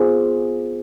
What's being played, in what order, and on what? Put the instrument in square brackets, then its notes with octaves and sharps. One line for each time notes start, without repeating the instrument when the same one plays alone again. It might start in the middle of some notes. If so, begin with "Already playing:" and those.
Already playing: [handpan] B3 F4 G#4 C5